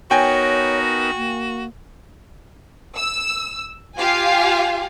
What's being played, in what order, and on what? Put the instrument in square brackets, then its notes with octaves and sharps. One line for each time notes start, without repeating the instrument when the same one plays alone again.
[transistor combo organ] B3 D#4 A#4 [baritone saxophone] F#4 [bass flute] C#5 [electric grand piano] G5 G#5
[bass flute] A#3
[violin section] E6
F4 G4 F5 G#5